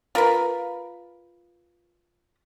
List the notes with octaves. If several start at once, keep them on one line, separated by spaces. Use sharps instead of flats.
F4 A#4 B4